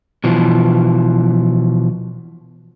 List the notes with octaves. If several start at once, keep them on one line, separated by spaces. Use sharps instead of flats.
B2 E3 F3